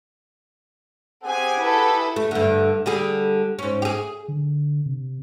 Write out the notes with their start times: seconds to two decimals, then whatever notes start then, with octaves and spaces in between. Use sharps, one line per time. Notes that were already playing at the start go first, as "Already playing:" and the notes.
1.23 C4 G4 G#4 F#5 G#5
1.61 E4 A4 B4
2.16 A3
2.31 G2 D3
2.86 D3 G3 G#4
3.59 G#2 C#4
3.82 G4 G#4
4.28 D3
4.86 C3